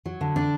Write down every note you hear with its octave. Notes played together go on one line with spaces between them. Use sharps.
F#3
D3
D4